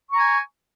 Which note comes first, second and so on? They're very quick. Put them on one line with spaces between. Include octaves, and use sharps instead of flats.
C#6 A#5 G#5